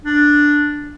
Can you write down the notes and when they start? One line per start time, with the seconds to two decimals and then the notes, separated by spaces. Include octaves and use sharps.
0.04 D4